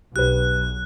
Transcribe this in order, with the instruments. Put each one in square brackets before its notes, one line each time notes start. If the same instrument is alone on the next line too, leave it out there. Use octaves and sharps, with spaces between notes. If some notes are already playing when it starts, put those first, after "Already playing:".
[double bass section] B1 [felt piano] G4 B4 [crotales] F#6